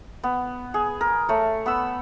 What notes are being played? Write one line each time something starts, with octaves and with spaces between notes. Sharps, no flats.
B3
G#4
A#4
A3 C#5
B3 B5 E6